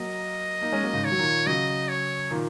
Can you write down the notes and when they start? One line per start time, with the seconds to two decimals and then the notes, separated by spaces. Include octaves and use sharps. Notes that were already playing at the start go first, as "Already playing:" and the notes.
Already playing: F#3 A#3 D#5
0.61 A#3 D#4
0.72 G#3 C#4
0.83 F#3 A#3
0.93 G#2 C#3
1.04 D#3 C#5
1.11 F#3
1.19 A#2 D#3
1.46 C#3 F#3 D#5
1.89 C#5
2.31 A#2 D#3